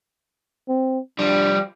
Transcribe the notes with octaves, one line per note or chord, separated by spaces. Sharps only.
C4
F3 G3 D4